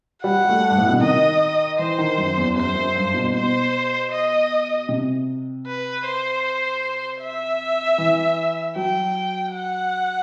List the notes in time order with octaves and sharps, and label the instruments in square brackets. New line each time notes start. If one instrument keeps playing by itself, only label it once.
[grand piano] G3 [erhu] F#5
[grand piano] G3
A3
G2
A2
B2
C3
[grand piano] D#3 [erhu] D#5
[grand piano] E3 [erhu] C5
[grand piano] D#3
F#2
E2
[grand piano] F#2 [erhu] C5
[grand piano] F#2
G2
B2
[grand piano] B2 [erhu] C5
[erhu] D#5
[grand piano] C3
[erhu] B4
C5
E5
[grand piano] E3
[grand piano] F#3 [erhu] G5
[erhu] F#5